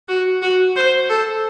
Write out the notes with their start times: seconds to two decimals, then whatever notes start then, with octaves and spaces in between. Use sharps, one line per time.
0.08 F#4
0.42 F#4
0.76 C5
1.10 A4